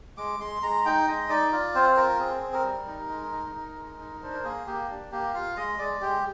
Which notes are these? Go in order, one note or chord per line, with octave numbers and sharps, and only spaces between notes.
G#3 D6
G#3 C6
G#3 A#5
D#4 G5
G#3 D#5
D#4 D5
F4 D5
C4 C5
F4 A#4
C4 G#4
C4
A#4
G3
D#4
G#3
D#4
D#4
G#3
D#4
D4 C5
A#4
A#3 G#4
A#3 G4
D4
A#3 G4
F4 F5
G#3 D#5
G#3 D5
G#3 G4